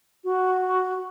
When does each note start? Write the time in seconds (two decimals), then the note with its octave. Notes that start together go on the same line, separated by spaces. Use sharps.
0.24 F#4